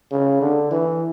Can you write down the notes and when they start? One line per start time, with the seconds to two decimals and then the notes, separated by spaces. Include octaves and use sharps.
0.11 C#3
0.42 D3
0.71 E3